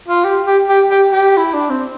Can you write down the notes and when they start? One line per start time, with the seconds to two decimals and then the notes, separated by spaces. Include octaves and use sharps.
0.09 F4
0.24 G4
0.46 G4
0.69 G4
0.91 G4
1.12 G4
1.37 E4
1.54 D4
1.70 C4